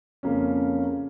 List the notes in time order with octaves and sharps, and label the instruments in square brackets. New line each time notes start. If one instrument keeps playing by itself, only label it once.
[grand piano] F2 C#3 F3 A#3 C#4